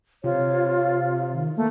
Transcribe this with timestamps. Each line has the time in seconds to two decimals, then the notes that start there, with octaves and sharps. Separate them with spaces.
0.24 C3 F4 C#5
1.33 D#3
1.56 A3 A#3